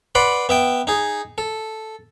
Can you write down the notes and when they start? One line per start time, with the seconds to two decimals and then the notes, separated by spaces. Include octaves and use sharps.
0.15 B4 D5 F#5 B5 C6
0.49 B3 E5 G5
0.87 D#4 G#4
1.38 A4